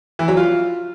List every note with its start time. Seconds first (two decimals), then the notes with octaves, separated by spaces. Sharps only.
0.19 E3
0.28 F#3
0.37 F4